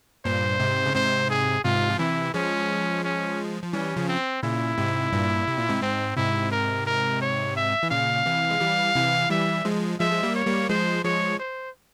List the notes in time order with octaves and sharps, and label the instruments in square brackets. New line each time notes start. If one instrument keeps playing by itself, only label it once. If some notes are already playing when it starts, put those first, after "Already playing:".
[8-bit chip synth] G2 A#2 [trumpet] C5
[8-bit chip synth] G#2 C3
C#3
[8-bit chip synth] G#2 C3 [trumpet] C5
[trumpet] G#4
[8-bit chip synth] G#2 C3 [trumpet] F4
[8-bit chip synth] F3
[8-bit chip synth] C3 E3 [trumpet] E4
[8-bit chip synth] F3 G#3 [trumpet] C#4
[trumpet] C#4
[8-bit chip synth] F3
[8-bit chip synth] E3 G3 [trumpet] C#4
[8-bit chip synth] C#3 F3
[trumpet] C4
[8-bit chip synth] A#2 C#3 [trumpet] E4
[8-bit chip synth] G#2 C3
G2 A#2
C3
A#2
G#2 C3
[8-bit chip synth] G#2 [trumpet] C4
[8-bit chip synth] G#2 C3 [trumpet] E4
[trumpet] A#4
A#4
C#5
E5
[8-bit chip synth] E3
[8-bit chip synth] A#2 C#3 [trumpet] F5
[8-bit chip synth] C3 E3
G#3
E3 G3
C3 E3
[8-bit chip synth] E3 G3 [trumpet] E5
[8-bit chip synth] F3 G#3
[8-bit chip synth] F3 G#3 [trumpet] E5
[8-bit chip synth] G#3
G3 A#3
[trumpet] C#5
[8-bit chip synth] G3 A#3
[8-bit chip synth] F3 G#3 [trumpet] C5
[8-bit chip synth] F3 G#3 [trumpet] C#5
[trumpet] C5